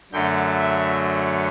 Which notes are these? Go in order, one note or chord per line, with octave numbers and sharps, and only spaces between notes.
F#2 D3 F#3 A3 G5
E5